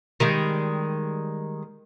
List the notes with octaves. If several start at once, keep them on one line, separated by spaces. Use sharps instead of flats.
D#3 G3 G#3